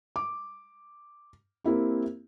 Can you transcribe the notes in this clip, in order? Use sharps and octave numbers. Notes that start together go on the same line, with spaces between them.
D6
A#3 C4 E4 G4